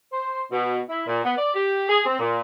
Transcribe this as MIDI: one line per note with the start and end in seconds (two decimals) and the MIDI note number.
0.12 0.44 72
0.51 0.78 47
0.89 1.02 64
1.06 1.20 46
1.24 1.36 59
1.37 1.49 74
1.54 1.84 67
1.88 2.04 68
2.06 2.17 60
2.18 2.40 46